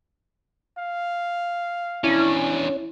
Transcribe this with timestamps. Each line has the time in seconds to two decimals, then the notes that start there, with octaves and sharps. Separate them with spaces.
0.78 F5
2.04 E2 C#4 D4 E4